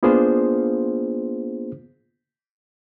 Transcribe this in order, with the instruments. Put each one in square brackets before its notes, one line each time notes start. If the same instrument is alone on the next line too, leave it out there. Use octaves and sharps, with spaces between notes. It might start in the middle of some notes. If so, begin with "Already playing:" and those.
[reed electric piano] A#3 B3 D4 F4 G#4 C5